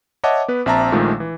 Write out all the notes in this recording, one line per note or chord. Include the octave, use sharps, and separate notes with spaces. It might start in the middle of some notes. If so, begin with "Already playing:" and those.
C#5 D#5 E5 F#5 A5 D6
B3 B4
A#1 C4 E5 A5 A#5
A#1 A#2 D#3 F3 G#3 A3
E3